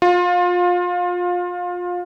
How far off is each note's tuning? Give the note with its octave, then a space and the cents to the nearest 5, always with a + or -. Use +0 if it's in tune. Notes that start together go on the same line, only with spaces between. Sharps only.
F4 +25